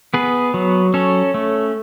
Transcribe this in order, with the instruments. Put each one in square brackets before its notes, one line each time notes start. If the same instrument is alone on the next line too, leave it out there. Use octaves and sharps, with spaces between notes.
[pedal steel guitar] B3 G#4 B4
F#3
C#4 A4 C#5
A3